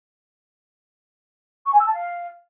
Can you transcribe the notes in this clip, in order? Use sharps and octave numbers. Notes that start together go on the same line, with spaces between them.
C#6
G#5
E6
A5
F5